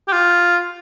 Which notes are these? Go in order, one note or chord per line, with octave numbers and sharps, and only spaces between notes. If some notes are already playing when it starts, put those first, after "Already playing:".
G4
F4